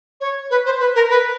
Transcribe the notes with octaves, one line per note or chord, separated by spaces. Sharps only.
C#5
B4
C5
B4
A#4
B4